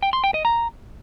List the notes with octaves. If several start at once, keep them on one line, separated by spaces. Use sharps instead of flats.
G5
C6
G5
D#5
A#5